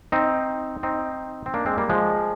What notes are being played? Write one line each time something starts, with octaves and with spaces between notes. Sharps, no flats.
C4 D#4
C4 D#4
C4
A#3 D4
G#3 C4
G3 A#3
F3 G#3